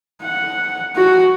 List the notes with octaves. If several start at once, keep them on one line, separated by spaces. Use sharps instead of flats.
F#5
F#4